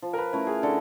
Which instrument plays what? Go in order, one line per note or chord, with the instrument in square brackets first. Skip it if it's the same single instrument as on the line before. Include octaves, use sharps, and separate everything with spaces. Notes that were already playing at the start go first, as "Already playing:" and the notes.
[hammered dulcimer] F3
[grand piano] A#4
B4
[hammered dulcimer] A3 C#4 E4
[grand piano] G#4
[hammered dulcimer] D3 [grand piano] A4